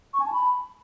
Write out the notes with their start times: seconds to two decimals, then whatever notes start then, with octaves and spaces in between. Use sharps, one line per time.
0.14 C#6
0.20 G#5
0.26 A5
0.32 B5